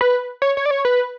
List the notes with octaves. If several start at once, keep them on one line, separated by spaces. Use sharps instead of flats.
B4
C#5
C#5
D5
C#5
B4